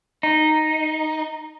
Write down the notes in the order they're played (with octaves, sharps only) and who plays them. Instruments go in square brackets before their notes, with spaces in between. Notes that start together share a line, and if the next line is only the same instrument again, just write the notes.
[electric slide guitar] D#4